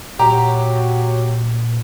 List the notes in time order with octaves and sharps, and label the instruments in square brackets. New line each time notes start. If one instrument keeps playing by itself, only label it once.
[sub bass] A#2 [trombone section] F#3 [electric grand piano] G4 [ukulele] A#5